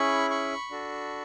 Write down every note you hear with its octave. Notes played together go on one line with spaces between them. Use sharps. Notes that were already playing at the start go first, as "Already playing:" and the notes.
Already playing: C#4 E4 G#4 B5 C#6
B5 C#6
D4 F#4 A4